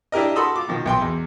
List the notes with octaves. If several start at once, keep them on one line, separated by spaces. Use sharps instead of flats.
D4 E4 G4 A#4 D#5
F#4 A4 B5 C6 D#6 E6
F4 D6
B2 D#3 F3
B1 G5 C6
E2